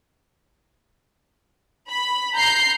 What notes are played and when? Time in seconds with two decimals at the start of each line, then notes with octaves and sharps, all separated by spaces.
1.88 B5
2.36 A#5 G6 C7